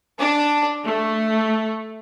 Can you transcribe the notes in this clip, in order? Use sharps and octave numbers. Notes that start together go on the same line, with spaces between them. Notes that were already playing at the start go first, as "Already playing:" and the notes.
D4
A3